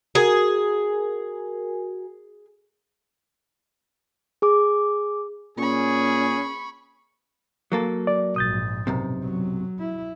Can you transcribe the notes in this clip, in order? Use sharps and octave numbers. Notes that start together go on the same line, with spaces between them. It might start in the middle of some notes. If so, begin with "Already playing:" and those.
F#4 G#4 A#4 G#5
G#4 D6
A#2 C#4 G#4 B5 C#6
F#3 A#3 A4
D5
A#1 G#2 D#6 G6 A6
B1 F#2 C3
F#3
E4